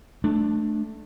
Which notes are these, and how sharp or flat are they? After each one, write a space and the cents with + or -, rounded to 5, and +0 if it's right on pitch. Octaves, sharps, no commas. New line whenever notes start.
A3 -10 D4 +15